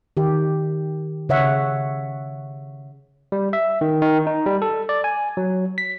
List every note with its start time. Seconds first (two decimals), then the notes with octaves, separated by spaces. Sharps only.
0.17 D#3 G4
1.29 C#3 C#5 E5 F#5
3.32 G3
3.53 E5
3.81 D#3
4.02 D#3
4.27 D#4
4.46 G3
4.62 A4
4.89 D5
5.04 G#5
5.37 F#3
5.78 B6